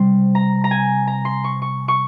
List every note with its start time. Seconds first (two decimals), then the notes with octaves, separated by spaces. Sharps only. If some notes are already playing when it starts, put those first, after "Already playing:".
Already playing: C3 G3 C6
0.35 A#5
0.64 A#5
0.71 G#5
1.07 A#5
1.25 C6
1.44 C#6
1.62 C#6
1.88 C#6